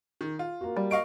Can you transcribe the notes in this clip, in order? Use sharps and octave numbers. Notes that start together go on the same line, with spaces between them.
D#3
F4
A#3 F#4
G3
D#5 F5 C#6 D7